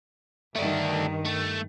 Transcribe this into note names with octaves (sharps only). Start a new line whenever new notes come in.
G2 D#3 A3 D4
A3